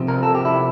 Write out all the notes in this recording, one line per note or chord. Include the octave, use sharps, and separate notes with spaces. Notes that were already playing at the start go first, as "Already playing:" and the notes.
Already playing: C3 F3 C4
A#4
A4
G4
E4